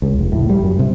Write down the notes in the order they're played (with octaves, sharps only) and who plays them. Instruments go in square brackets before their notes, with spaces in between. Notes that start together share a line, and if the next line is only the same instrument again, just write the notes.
[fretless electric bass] C#2
F1
A2
G3
F#2
C3